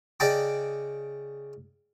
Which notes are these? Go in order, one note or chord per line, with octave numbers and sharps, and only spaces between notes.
C#3 D5 D#5 G5 A5 D6